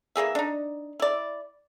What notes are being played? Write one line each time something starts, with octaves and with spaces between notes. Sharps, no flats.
E3 A#3 G#4 E5
D4 D#4
E4 D5